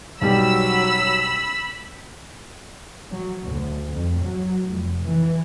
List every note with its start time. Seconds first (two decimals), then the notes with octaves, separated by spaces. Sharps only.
0.22 B1 F#3 G3 G4 B5 E6
3.11 F#3
3.46 D2
3.92 F2
4.22 F#3
4.70 F1
5.08 E3